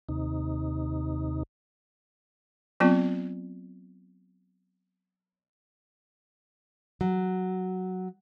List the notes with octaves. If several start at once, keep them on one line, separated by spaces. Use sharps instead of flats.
D#2 C3 D#4
F#3 B3 C4 F4
F#3